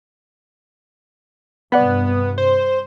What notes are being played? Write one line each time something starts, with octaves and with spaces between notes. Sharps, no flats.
G2 C3 B3 D5 F#5 B5
C5